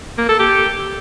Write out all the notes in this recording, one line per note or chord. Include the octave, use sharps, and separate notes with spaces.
A#3
A4
G4